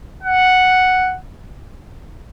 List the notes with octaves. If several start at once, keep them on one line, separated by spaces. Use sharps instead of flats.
F#5